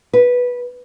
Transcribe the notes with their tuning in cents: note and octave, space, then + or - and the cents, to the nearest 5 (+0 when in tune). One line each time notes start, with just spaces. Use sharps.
B4 -10